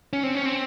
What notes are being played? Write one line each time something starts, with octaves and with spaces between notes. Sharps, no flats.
C#4
C4
C#4
C4